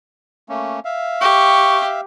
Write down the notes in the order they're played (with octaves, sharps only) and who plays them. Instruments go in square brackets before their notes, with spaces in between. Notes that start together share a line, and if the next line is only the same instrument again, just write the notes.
[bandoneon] A3 A#3 C#4
E5 F5
[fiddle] G4 [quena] C#6